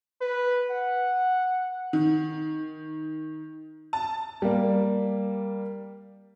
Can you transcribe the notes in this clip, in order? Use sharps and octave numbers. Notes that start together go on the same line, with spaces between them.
B4
F#5
D#3
A5
G3 A#3